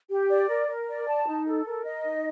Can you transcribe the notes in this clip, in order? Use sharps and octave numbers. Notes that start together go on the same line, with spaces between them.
G4
D5
A#4
A#4
D5
A5
D#4
A4
A#4
D#5
D#4